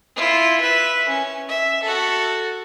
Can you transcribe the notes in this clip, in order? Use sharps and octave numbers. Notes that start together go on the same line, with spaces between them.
E4 F4
B4 E5
C#4
E5
F#4 A4